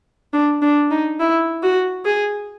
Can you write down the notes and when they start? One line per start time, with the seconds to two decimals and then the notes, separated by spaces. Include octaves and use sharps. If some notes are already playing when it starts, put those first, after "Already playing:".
0.33 D4
0.62 D4
0.91 D#4
1.20 E4
1.63 F#4
2.05 G#4